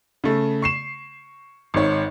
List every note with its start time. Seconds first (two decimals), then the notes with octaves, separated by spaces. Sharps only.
0.24 C#3 A3
0.62 C#6 C7 E7
1.74 G#1 G#2 C#5